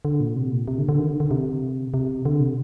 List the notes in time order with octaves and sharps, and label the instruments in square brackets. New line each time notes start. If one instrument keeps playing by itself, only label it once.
[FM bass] D3
A#2
C3
A#2
C3
D3
D3
D#3
D3
D3
C3
C3
D3
C3